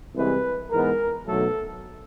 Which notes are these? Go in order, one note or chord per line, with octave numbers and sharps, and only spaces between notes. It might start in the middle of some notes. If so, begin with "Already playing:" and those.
C2 C3 E3 G#3 B4
G#2 E3 G#3 B3 A#4
B1 B2 F#3 A3 A4